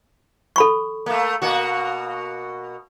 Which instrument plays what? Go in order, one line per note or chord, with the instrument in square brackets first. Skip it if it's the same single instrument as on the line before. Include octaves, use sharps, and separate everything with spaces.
[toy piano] A4 B5 C#6
[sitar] A3 A#3
B2 A#3 F#4